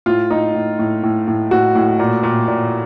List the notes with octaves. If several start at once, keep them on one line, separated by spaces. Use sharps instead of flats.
A2 F4
A2 D#4
A2
A2
A2
A2
A2 F#4
A2
A#2
A#2
A#2